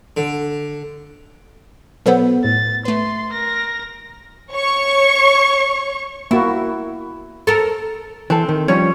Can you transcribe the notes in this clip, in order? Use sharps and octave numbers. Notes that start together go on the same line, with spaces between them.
D3
B2 F#3 B3 A4 C5
A2 A6
A3 B4 C6
A#4 A#6
C#5 C#6
A#3 E4 F#4
A4 A#4
E3 C4 A4
D#3
F3 G3 C#4 C#5